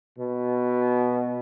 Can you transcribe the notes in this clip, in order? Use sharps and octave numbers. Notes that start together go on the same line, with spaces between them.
B2